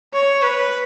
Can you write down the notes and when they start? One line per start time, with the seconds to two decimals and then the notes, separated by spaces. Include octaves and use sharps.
0.14 C#5
0.42 B4